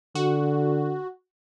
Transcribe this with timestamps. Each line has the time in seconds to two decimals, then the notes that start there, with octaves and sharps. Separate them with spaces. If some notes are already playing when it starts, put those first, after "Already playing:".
0.15 D3 F#4